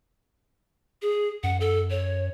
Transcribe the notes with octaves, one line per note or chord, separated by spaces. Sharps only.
G#4
F#2 F#5
A4
C#5